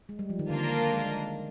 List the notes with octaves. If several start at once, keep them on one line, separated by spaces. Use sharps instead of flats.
G#3
G3
F3
D#3
D3 A#3 D4 F4 A#4
G#3